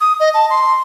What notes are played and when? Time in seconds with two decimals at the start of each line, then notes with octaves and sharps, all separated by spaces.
0.01 D#6
0.20 D#5
0.34 A5
0.50 C6